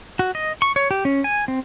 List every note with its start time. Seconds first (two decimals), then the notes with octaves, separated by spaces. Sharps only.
0.19 F#4
0.35 D#5
0.62 C#6
0.76 C#5
0.91 G4
1.05 C#4
1.24 G#5
1.48 C4